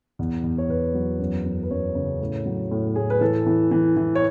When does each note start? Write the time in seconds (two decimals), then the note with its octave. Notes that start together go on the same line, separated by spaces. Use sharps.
0.19 E2
0.44 E2
0.58 C#5
0.69 E2 B4
0.94 F#3
1.19 F#2
1.44 F#2
1.63 B4
1.71 F#2 C#5
1.95 C#3
2.20 A2
2.46 F#3
2.71 A2
2.96 A2 G#4
3.10 B4
3.21 E3 A4
3.46 E3
3.71 E3
3.97 E3
4.15 C#5